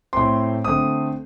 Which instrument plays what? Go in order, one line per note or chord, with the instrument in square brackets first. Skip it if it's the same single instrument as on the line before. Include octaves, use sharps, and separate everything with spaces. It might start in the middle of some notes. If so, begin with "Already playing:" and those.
[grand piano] A2 A3 C4 C6
D3 A3 C4 D#6